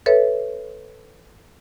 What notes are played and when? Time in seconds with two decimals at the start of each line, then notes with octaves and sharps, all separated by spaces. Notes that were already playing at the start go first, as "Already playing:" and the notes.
0.06 A4 B4 C#5 E5